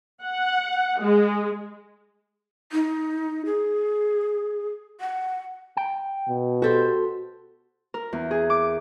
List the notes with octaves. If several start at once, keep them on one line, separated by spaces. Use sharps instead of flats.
F#5
G#3
D#4
G#4
F#5
G5
B2
F#4 G4 A4 C5
A#4
E2
G#4
D6